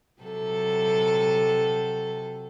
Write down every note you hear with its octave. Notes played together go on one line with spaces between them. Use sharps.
C3 F#3 A4